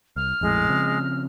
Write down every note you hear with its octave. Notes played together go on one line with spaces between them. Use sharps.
C2 F6
A#1 F2 A2 G#3
C#3 F3 C4